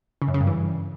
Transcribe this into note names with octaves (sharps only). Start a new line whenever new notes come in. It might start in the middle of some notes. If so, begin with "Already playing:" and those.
C#3
F#2
C#3
G2
E3